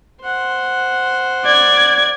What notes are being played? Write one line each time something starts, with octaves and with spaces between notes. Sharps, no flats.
C5 F#5
D5 G#6